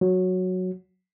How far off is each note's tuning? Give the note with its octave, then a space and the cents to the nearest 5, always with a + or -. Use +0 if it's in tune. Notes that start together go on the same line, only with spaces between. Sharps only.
F#3 -5